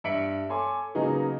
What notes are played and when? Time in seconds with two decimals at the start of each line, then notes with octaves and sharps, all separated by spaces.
0.04 G2 E5 B6 C#7 D7 F#7
0.49 A4 C#5 G#5 C6 D6
0.95 C#3 F#3 A#3 B3 D#4 G#4